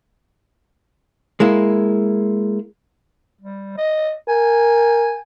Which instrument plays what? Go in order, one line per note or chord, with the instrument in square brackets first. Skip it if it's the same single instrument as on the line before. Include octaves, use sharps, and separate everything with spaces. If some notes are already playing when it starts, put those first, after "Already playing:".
[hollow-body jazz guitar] G#3 A#3 E4
[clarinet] G3
D#5
[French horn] A#4 [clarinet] G#5